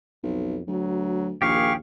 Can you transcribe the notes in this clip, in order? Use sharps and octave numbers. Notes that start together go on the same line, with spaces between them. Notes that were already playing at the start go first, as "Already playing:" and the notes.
B1 F2
D2 F#3
A#1 D#2 G4 G#4 F5 C#6